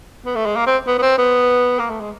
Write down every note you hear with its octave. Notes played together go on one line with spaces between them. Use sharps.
B3
A3
G#3
A#3
C4
B3
B3
C4
B3
A#3
A3
G#3